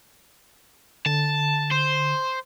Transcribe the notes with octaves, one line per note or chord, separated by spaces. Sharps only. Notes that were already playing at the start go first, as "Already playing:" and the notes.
D3 A5
C5